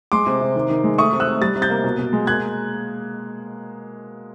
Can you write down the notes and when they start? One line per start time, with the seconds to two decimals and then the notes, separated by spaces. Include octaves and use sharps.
0.12 G#3 C6 D6
0.26 C3
0.41 C3
0.56 D#3
0.70 D#3
0.84 G#3
0.98 A3 C#6 D#6
1.12 C3
1.20 E6 F#6
1.27 C3
1.41 G3 A6
1.56 C3
1.62 G6 A6
1.70 A#3
1.84 B2
1.99 B2
2.13 G#3
2.27 A#3 F#6 G#6